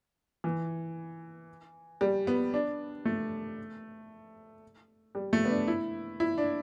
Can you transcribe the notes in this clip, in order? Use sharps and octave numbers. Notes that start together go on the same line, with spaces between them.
E3
G3
B3
D4
A3
G3
A3
B3
D4
E4
E4
D4